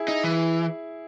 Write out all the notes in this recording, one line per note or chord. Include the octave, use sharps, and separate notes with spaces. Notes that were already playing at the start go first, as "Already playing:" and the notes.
Already playing: E4 G#4
D#4
E3